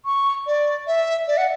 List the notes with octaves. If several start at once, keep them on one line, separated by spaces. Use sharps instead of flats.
C#6
D5
E5
D5
F#5